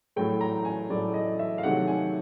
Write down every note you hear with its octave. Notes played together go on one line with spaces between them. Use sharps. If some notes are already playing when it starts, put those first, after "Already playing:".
A2 F#3 A3 G5
A#5
G#5
A2 F#3 A3 D5
D#5
E5
F5
C3 D#3 F#3 A3 F#5
G#5